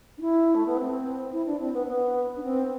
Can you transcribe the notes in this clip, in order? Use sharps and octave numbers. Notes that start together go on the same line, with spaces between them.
D4
E4
A3
B3
C4
E4
D4
C4
B3
B3
D4
C4